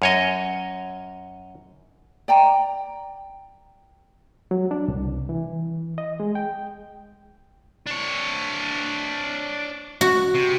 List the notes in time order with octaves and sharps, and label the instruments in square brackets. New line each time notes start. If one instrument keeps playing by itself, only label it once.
[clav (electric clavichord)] F#2 C#5 D#5
[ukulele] D5 G5 A#5
[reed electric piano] F#3
D4
C2
E3
D#5
G#3
G5
[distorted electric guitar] D4 C#5
[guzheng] F#4
[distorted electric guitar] C3